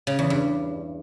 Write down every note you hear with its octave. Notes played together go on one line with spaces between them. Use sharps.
C#3
E2
G2